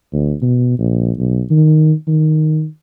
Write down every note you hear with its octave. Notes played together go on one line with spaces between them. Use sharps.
D2
B2
A#1
B1
D#3
D#3